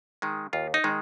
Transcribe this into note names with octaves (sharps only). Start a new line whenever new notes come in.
D#3 G#3
D#2 F4
D#4
D#3 G#3